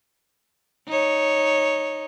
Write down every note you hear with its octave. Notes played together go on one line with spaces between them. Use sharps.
D#4 C#5